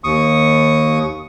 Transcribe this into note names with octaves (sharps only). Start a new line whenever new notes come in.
D#2 C#6 D#6